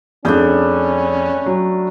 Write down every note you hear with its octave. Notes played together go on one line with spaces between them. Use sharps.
F2 G3 A3 C#4 D4 G#4 G6
F#3